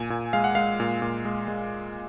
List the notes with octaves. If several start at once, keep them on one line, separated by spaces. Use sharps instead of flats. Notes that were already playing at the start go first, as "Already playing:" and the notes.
Already playing: A#2 G#5
A#2
G#3 F5
F#5
G#3 F5
A#2
A#2
G#3
G#3